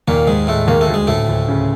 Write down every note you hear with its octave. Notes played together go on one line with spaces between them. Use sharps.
D#2 A#2 A#3
D#2 G#2 G#3
A2 G#3 A3
D#2 A#3
A3
D2
G#3
D2 A2 A3
D2
C#3